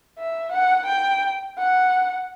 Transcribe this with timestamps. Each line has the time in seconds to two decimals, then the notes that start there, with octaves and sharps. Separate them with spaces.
0.19 E5
0.52 F#5
0.86 G5
1.59 F#5